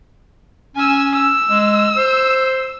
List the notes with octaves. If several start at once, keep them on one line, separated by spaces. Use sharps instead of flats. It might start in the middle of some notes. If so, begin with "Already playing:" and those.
C#4 G#5 E6
E6
G#3
C5